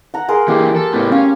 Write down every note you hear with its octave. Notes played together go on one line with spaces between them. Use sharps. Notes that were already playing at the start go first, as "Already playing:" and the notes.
F#5 A#5
G#4 A#4 C6
E3 A#3 G4
A4
A2 B3
C#4 F5